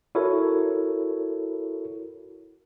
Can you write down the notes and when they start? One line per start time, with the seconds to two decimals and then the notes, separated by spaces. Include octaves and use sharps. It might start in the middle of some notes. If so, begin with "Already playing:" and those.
0.15 E4 F#4 A4 A#4 C#5